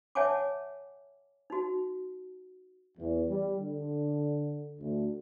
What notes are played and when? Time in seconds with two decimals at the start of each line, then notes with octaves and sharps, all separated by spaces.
0.15 C#5 E5 F#5 G#5 A5 D6
1.50 D#4 F#4
2.98 E2
3.30 G3
3.58 D3
4.80 D2